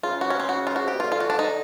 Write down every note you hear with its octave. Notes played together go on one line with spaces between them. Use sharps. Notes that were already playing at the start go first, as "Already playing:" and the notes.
C#3 F4
F#4
C#4
C4
F#4
F4
F#4
C3 G4
B2
F4
D3
F4
F#4
D4
D#4